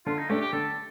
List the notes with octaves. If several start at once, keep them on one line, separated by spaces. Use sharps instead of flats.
D3 F4
D#4
A3 D4 G4
G4
D3 A4